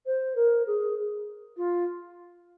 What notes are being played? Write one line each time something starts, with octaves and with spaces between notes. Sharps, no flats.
C5
A#4
G#4
F4